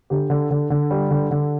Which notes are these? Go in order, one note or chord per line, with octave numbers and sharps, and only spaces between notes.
D3 G4
D3
D3
D3
G3
D3
D3